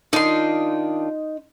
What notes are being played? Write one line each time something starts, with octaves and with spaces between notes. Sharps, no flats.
D#3 D4 D#4 F4 C6